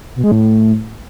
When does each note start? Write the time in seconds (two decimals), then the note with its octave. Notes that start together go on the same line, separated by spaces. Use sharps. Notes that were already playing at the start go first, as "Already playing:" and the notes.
0.16 B2
0.24 G#3
0.32 A2